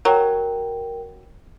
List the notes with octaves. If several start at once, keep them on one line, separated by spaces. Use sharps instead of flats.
F#3 A#4 G5